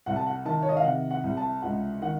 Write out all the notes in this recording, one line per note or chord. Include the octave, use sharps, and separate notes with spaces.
C2 F#5
A5
F#5
D#3 A5
C#5
D#5
F5
C3 F#5
F#5
C2
A5
C#2 F#5
D#3 F#5